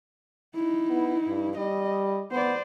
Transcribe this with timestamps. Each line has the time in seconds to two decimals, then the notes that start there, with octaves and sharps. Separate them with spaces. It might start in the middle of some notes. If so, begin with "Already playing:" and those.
0.55 D#4 E4
0.90 B3
1.28 G2
1.57 G3 D#5
2.31 B3 C5 D5